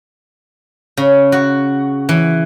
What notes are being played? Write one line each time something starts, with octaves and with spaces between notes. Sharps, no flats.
C#3
F#4
E3